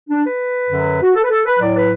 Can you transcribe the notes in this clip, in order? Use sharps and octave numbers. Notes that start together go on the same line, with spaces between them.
D4
B4
F#2 D3 F#3
F#4
A4
B4
A4
B4
A2 F#3 D5
B4